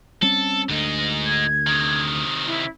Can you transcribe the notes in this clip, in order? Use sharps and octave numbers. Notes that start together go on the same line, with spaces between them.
G3 C4 C#4 A4
D2 G#2 D3 D#4
G#6
C3 D#3
E4